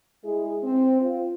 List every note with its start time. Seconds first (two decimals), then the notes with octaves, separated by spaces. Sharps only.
0.24 G#3 E4 G#4
0.64 C4
1.01 F4